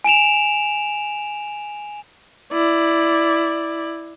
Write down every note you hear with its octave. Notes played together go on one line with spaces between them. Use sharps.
G#5 D7 E7 F7
E4 D5